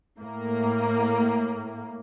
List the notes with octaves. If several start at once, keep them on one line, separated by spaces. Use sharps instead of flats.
A2 A#3